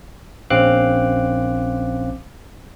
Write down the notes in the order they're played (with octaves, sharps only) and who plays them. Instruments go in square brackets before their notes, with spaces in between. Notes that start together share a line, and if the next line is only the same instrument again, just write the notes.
[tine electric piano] A#1 C4 C#4 F5 D6 F#6